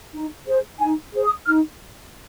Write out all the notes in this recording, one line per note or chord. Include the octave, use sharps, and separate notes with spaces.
D#4
G#4 C5
D#4 G#5
G#4 C5
D#6
D#4 F6